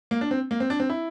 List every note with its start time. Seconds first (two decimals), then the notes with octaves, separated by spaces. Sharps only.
0.11 A#3
0.21 D4
0.31 C4
0.51 A#3
0.60 C4
0.70 D4
0.80 C4
0.90 E4